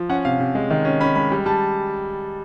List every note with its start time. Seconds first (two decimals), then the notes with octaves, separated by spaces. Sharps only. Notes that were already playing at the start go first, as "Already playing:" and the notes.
Already playing: F3
0.09 C#4 F#5
0.25 C3 F5
0.40 C3
0.55 G#3
0.70 D#3
0.85 C#4
1.00 C#4 B5
1.15 G#3 B5
1.32 G3
1.46 G3 A5